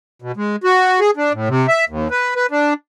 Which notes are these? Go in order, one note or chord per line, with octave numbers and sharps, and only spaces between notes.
B2
G#3
F#4
G#4
D4
A2
C3
E5
D#2
B4
B4
D4